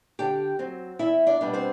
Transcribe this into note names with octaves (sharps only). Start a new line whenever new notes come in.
D3 G4 G5
F#3 C4
E2 E4 E5
D4 D5
B2 G3 B3 D4
C4 C5